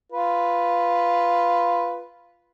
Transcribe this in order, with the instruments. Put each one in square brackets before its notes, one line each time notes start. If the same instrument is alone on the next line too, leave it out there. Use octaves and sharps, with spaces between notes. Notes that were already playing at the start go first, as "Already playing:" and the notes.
[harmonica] F4 B4